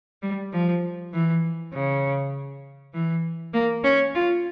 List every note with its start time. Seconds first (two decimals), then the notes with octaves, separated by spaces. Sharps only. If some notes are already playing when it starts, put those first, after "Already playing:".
0.22 G3
0.52 F3
1.13 E3
1.73 C#3
2.94 E3
3.53 A#3
3.83 C#4
4.14 F4